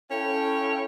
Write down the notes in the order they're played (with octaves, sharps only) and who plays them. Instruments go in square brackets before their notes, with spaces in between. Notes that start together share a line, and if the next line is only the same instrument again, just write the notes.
[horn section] C#4 E4 A4 C#5 F5 G5